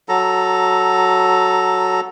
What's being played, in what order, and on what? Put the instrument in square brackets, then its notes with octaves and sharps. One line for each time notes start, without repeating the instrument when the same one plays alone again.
[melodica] F#3 A4 A#5